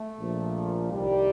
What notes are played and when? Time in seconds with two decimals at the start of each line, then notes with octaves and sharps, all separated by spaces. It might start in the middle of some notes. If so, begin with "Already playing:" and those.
Already playing: A3
0.17 A#1 A#2 F3
0.91 C2 C3 D#3 G3